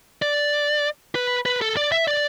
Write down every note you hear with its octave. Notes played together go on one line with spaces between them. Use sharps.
D5
B4
B4
A4
D5
E5
D5